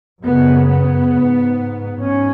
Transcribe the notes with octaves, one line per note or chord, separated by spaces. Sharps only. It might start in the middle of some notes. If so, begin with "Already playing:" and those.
F#2 C#3 B3
B3
G#2
G#2 C#4